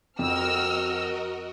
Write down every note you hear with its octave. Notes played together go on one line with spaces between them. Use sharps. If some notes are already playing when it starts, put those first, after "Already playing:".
F2 F#4 A#4 D#5 E6 F6